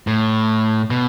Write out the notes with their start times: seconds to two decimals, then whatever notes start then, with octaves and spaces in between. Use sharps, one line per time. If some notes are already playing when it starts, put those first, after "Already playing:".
0.07 A2
0.90 B2